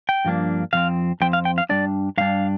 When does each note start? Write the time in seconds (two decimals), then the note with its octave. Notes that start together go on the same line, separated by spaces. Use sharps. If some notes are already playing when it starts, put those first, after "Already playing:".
0.09 G5
0.25 G2 F3 A#3 D4
0.73 F2 F3 C4 F5
1.21 F2 F3 C4 G5
1.33 F5
1.45 G5
1.58 F5
1.69 G2 G3 D4 D5
2.18 G2 G3 D4 F5